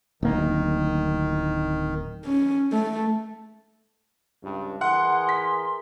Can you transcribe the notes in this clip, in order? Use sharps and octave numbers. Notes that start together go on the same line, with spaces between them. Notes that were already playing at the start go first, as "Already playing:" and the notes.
D1 D#3 A#3
C#4
A3
C#2 G2
E3 G#4 A#4 F#5 C6
B6